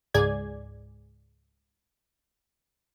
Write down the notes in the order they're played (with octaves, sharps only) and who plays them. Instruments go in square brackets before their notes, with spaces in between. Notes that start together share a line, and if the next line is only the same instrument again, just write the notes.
[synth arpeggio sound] C#2 G#2 G#4 D5 G#6